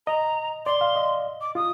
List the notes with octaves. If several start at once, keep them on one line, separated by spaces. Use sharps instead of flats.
D#5 A#5
D5 C6
F5
D#5
D6
F4 D#6